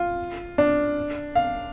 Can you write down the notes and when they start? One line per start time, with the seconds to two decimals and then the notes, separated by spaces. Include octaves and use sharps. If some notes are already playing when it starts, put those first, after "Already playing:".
Already playing: F4
0.58 D4
1.35 F5